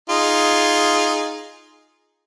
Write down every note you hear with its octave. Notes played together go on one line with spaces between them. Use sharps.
D#4 F4 G#4